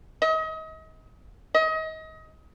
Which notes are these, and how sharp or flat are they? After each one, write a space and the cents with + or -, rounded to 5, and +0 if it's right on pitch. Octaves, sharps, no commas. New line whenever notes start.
D#5 +35
D#5 +30